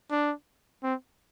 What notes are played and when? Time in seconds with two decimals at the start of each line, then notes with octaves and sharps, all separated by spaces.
0.11 D4
0.83 C4